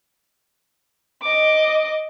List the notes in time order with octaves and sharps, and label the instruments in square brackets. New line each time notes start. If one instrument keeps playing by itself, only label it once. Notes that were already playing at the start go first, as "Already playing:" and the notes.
[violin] D#5 D6